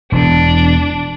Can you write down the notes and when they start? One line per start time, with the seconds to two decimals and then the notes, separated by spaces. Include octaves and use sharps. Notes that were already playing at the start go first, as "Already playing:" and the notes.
0.12 E1 E2 B2 D4